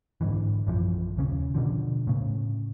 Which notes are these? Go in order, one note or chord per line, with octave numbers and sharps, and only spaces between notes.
G#2 B2 D3 E3
A#1 F#2 E3 F3
D#1 C#3 C#4
B2 D3 F3
A2 C#3